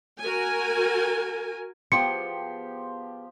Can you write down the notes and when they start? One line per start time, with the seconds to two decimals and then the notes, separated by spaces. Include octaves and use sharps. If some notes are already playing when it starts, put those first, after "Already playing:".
0.21 F#4 A#4 G#5
1.92 F3 B3 G4 G#4 G5 C6 C#7